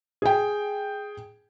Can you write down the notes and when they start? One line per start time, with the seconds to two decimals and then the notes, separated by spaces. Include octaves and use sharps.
0.22 G#4 G5